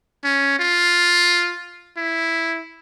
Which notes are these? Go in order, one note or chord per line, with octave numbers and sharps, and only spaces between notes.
C#4
F4
E4